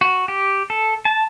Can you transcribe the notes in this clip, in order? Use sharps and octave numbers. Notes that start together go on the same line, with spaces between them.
F#4
G4
A4
A5